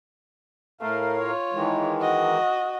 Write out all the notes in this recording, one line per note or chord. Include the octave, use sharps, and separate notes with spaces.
A2 A3 A#4 F5
F4 C#5
D#3 E3 G#3
F#4 D#5